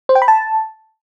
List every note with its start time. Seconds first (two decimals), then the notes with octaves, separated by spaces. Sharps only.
0.09 C5
0.15 G5
0.22 B5
0.28 A5